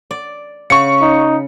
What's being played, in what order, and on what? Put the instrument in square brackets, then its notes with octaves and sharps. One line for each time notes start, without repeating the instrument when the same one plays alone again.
[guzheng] D5
[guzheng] C#3 [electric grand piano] C#6 C#7
[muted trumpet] D#4